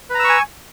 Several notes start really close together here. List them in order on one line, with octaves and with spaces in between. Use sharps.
B4 A#5 E6 C#6 G#5